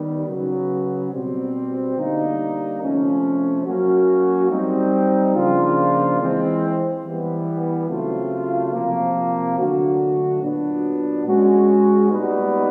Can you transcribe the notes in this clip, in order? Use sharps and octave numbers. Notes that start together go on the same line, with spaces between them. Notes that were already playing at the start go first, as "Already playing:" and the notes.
Already playing: D#3 G3 B3
C#3 F#3 B3
B2 G3 C4
D3 G3 A#3 D#4
C3 F3 A3 C#4
F#3 A#3 C#4 F#4
G3 C4 D#4
C#3 F3 A#3 D4 F4
E3 G#3 C4
E3 G3 B3
C#3 F#3 A3 C4 F4
C3 F3 A#3
D3 F#3 A3 D4 F#4
A#2 F#3 B3 D4
G#3 C#4 F#4
A#2 G3 B3 D#4